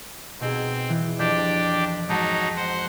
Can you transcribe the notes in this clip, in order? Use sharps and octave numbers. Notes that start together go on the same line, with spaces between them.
B2 C4 D#4 G#4
E3
F2 D4 G4 G6
G#2 F#3 D#4 A5 A6
C5 F#5